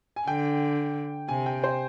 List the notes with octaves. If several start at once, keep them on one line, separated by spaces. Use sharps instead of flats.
G#5
D3 G5
C3 G#5
G5
C5